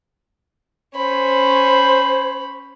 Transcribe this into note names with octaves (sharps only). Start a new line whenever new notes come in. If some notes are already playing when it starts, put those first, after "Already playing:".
C#4 C5 B5